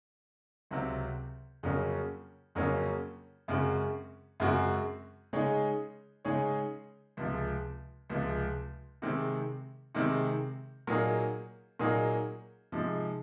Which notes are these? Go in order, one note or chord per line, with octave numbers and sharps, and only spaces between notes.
C#2 C3 F#3 C4
F2 C#3 F#3 A#3 C#4
F2 C#3 F#3 A#3 C#4
F#2 C#3 G#3 C4 F#4
F#2 C#3 G#3 C4 F#4
C#3 G#3 D#4 G#4 C#5
C#3 G#3 D#4 G#4 C#5
C#2 C3 F3 G#3
C#2 C3 F3 G#3
C3 D#3 G#3 C4
C3 D#3 G#3 C4
A#2 F#3 A#3 D#4 G#4
A#2 F#3 A#3 D#4 G#4
C3 F3 G#3 D#4